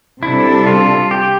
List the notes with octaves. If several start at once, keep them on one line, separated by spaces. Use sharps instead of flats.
C3 G3 D4 E4 A4
F4
G4